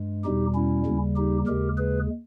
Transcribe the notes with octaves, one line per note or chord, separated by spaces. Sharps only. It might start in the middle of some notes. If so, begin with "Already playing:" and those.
Already playing: G2 G#3
E2 B2 G3 D#4 G4
C#4 E4
D#2 C#3 G3
D#4 G4
D#2 C#3 G#3 G4 A#4
G#4 B4